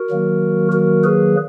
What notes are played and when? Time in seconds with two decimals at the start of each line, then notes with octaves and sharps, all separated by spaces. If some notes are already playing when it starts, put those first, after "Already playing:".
Already playing: F#4 A#4
0.10 D#3 F#3 A#3
0.72 F#4 A#4
1.04 G#4 B4